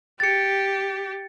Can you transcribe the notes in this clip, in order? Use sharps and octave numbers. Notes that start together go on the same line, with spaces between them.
G4 A6 C#7